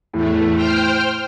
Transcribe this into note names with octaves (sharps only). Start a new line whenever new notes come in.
E2 A2 A3
C5 G5 F6